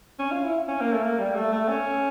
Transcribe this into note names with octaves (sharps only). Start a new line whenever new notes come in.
C#4
F4
E4
C#4
A#3
A3
A#3
G3
A3
A3
C#4